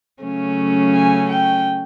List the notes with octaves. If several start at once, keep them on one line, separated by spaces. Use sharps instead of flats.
C#3 F#3 A3 C#4
G#5
G5